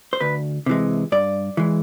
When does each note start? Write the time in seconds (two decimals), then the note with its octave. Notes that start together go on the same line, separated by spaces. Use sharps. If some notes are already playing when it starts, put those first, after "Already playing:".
0.13 C5
0.20 D2 B4
0.66 C3 E3 G#3
1.12 G2 D5
1.57 E3 G#3